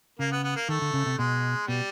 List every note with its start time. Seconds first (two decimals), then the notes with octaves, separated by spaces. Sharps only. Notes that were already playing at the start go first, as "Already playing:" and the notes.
0.19 C#3 A#3
0.32 B3
0.44 B3
0.56 A#3
0.69 D#3 A3
0.82 D3
0.93 C#3
1.06 C3
1.18 B2 G#3
1.68 B2 G3